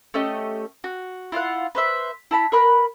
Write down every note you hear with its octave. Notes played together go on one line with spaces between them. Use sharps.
A3 C#4 G4 D#5
F#4
E4 F4 F5 F#5
B4 C5 E5
E4 A5 B5
A#4 B4 B5 F#6